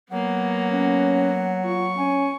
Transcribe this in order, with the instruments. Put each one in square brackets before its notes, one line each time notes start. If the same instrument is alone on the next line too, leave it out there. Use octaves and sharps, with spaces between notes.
[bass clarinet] F#3 [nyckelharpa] A#3 B3 [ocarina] F#5
[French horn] C#4
[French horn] F4 [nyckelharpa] C#6
[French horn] C#4 [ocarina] G#5